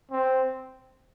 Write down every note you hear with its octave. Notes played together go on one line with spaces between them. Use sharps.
C4